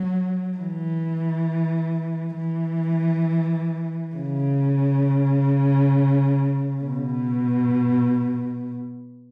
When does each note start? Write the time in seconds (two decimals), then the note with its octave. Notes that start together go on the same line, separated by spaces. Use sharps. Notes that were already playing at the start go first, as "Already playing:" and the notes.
Already playing: F#3
0.58 E3
2.37 E3
4.16 C#3
6.85 B2